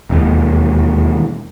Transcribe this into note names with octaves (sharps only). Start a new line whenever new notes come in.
E1 D#2